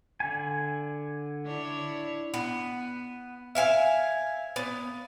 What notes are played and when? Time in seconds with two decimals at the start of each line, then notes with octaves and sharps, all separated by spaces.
0.20 D3 G#5
1.45 D4 E4 C#5
2.34 B3
3.55 E5 F5 G#5
4.56 B3